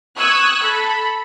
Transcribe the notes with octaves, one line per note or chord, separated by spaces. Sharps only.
C#6 D#6 E6 F#6 G#6
A4 B5